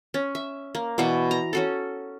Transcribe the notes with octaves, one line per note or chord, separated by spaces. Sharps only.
C#4
E5
A#3
B2 E3 F#4 D5
A#5
C#4 F#4 A4